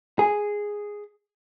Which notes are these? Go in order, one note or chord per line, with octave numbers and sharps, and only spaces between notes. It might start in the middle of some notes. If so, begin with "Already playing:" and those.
G#4